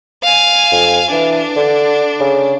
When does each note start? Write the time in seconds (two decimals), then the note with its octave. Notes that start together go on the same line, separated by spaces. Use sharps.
0.23 F5 G#5
0.72 F2
1.12 E3 D4
1.56 D3
2.20 C#3